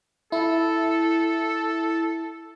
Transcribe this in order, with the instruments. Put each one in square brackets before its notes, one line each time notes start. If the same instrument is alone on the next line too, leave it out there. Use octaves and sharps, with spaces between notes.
[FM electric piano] E4 [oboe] A4